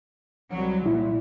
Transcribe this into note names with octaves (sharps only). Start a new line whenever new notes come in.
C2 F#3
A#2 E4